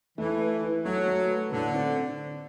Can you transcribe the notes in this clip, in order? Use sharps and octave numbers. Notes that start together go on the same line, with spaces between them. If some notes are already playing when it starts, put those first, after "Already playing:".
E3 A3
B4
E4
F#3 A3
A3
B4
A2 D3
C4